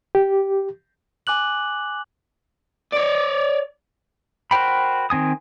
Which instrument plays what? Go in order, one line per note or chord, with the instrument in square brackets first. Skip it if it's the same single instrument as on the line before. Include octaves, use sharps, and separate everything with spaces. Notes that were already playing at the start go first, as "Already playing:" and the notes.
[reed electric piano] G4
[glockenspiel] G#5 D6 F#6 F#7
[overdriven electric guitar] C#5 D5
[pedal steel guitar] F#4 A#4 C5 G5 B5
D#3 C4 G#5 D#6